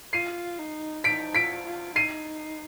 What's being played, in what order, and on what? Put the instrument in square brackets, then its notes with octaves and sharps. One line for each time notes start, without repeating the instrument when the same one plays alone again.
[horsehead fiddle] F4 [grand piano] C7 D#7
[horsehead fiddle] D#4
[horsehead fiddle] D#4 [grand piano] B6 D7
[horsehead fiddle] F4 [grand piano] B6 D7
[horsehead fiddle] F4
[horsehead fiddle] D#4 [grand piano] C7 D#7